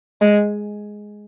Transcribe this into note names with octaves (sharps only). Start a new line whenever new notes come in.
G#3